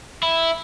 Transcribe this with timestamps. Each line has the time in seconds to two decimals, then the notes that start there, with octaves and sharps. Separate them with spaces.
0.23 E4